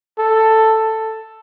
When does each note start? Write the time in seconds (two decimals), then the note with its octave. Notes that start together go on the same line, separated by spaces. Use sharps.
0.19 A4